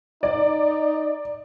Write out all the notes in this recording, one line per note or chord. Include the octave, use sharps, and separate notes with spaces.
D#4 D5